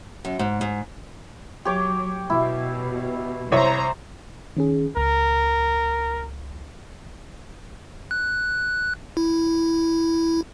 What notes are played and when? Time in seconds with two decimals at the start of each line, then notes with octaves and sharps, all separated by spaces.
0.25 F#2
0.39 G#2
0.61 G#2
1.65 F#3 G4 C#5 D6
2.30 B2 E4
3.52 C2 C5 C#5 E5 A#5
4.57 D#3 C#4 G#4
4.97 C#2 A#4
8.11 F#6
9.17 E4